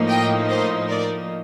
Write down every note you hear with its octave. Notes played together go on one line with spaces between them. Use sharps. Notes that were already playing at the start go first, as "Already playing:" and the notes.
Already playing: A2 F3 A#3 D#4
D#5 G5
C5 D#5
A#4 D5